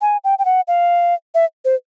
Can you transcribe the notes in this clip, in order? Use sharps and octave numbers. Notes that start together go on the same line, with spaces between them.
G#5
G5
G5
F#5
F5
E5
C5